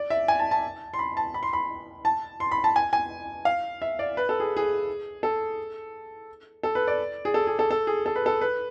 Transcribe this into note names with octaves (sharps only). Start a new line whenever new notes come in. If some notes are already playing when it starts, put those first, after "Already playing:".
Already playing: D5
E5
G#5
A5
A5
C6
B5
A5
B5
C6
B5
A5
C6
B5
A5
G#5
G#5
F5
E5
D5
B4
A4
G#4
G#4
A4
A4
B4
D5
G#4
A4
G#4
A4
A4
G#4
A4
B4
A4
B4